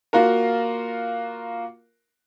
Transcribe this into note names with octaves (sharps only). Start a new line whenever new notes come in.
A#3 F4 F#4 A#4